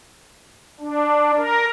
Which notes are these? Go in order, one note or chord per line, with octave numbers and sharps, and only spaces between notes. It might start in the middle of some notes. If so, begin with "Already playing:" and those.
D4
A#4